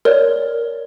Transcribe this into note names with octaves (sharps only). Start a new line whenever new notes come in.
A#4 C#5 D5